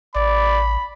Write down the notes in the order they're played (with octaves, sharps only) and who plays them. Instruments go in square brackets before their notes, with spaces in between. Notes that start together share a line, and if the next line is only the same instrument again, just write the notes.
[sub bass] A1 [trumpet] D5 [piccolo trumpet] B5